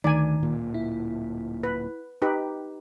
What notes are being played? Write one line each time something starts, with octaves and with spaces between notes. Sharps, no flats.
D2 D#3 D5 G#5
D1 A#2
E4
B4
D#4 G4 B4